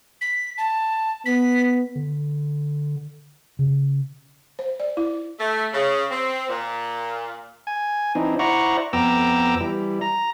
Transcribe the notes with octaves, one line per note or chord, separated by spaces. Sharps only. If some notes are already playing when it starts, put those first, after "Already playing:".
B6
A5
B3 B6
D3
C#3
C5
D5
E4
A3
C#3
C4
A#2
G#5
E3 C4 D4 D#4
E4 C5 D5 F#5 A#5 C#6
F2 B3 G5 A#5 D6 E6
E3 G3
A#5